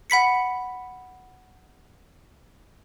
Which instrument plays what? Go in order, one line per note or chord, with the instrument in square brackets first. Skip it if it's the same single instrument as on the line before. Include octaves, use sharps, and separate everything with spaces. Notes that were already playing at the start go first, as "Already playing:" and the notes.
[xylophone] F#5 B5 B6 C#7